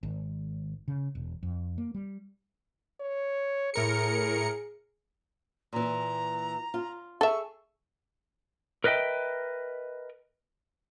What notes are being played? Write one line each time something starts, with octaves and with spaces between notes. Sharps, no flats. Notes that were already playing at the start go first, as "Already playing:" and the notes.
G#1
C#3
E1
F2
A#3
G3
C#5
A2 G#4 A#4 C#7
A#2 E3 A#5
F4
G#4 A4 E5 C#6
A#4 B4 D#5 E5 G5